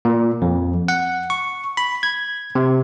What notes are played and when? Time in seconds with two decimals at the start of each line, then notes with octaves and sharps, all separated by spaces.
0.05 A#2
0.42 F2
0.88 F#5
1.30 C#6
1.77 B5
2.03 G#6
2.55 C3